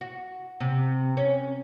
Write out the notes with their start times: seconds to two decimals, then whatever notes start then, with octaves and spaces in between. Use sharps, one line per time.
0.01 F#4
0.60 C3
1.17 C#4